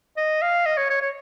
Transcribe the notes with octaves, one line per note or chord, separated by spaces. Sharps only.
D#5
F5
D#5
C#5
C#5
C#5